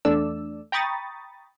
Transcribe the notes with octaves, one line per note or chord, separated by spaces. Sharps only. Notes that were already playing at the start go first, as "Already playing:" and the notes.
E2 A3 D4 D5 E6
G5 A#5 B5 C#6 D#6 A6